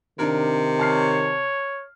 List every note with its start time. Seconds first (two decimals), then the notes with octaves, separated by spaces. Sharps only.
0.19 C3 D#3 D4 A#4
0.80 C#5 A5 F6 C7